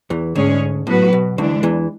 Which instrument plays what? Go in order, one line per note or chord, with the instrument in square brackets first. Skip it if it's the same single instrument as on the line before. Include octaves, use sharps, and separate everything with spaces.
[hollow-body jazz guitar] E2 E3
[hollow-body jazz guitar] D2 D3 [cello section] G#2 G#3 C#4 G#4 C#5
[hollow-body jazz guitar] A2 [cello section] F#3 B3 F#4 B4
[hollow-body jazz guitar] B2
[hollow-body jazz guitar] D2 D3 [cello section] E3 G#3 D4
[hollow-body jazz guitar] E2 E3